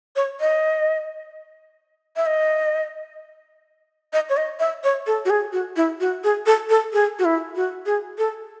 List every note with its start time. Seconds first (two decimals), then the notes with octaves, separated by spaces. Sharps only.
0.16 C#5
0.40 D#5
2.17 E5
2.26 D#5
4.13 D#5
4.29 C#5
4.37 D#5
4.59 E5
4.84 C#5
5.07 A4
5.25 F#4
5.30 G#4
5.53 F#4
5.76 E4
6.00 F#4
6.24 G#4
6.46 A4
6.70 A4
6.93 G#4
7.19 F#4
7.25 E4
7.56 F#4
7.86 G#4
8.18 A4